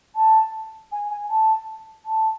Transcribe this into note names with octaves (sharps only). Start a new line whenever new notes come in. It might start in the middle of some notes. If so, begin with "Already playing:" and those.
A5
G#5
G#5
A5
A5